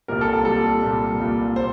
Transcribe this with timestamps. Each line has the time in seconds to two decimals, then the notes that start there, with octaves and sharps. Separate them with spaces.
0.08 C2 A#2 G3 A#4
0.21 A4
0.33 A4
0.45 C2 A#2 G3 A4
0.82 C2 A#2 G3
1.19 C2 A#2 G3
1.56 C5